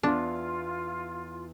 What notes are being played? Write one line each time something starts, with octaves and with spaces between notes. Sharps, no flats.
E2 D4 F4